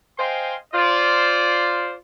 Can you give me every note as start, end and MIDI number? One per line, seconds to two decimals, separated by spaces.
0.19 0.55 72
0.19 0.55 75
0.19 0.55 77
0.19 0.55 79
0.19 0.55 80
0.19 0.55 84
0.74 1.95 65
0.74 1.95 72
0.74 1.95 74